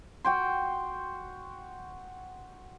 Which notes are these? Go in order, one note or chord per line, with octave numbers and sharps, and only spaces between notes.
F#4 G5 C6